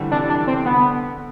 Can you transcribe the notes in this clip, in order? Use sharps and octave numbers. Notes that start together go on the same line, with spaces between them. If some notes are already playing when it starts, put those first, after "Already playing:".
Already playing: D3 E3 G3 A3 C4
C3 E3 D4
D4
C4
D3 B3